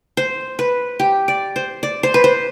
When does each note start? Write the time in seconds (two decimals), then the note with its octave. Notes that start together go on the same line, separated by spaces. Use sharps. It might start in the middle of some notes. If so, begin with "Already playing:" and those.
0.17 C5
0.59 B4
0.99 G4
1.28 D5
1.56 C5
1.83 D5
2.03 C5
2.14 B4
2.24 C5